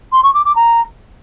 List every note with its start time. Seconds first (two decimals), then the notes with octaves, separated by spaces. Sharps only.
0.12 C6
0.23 C#6
0.34 D6
0.45 D6
0.55 A#5